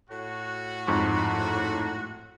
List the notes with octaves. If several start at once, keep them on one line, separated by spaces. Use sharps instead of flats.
A2 F#4
F2 G#2 C#6